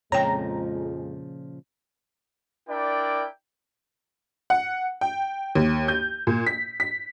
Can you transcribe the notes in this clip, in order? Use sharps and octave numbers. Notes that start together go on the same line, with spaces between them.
F2 A#2 C#3 F3 G#3 C#5 G5 A#5
D4 E4 A#4 D5 G5
F#5
G5
D#2
G6
A#2
B6
B6